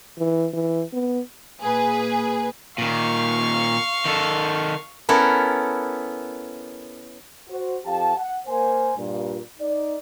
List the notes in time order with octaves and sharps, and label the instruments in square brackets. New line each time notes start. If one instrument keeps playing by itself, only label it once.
[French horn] E3
E3
B3
[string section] A#2 G#4 B4
[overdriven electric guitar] A#2 D#3 [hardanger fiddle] F5 C#6
[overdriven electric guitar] D#3 A4
[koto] B3 C#4 E4 A4 A#4
[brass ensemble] F#4 C5
F2 G4 F5 A5
F#5
A#3 C5 G#5
G2 A#2
D#4 D5